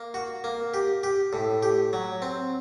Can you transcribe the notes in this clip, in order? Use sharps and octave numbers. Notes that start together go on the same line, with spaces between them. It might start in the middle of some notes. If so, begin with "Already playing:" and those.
Already playing: A#3
F#4
A#3
G4
G4
A2
G4
F#3
C4